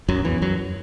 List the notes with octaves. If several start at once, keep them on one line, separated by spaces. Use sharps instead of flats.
F#2 F#3
E2 E3
F#2 F#3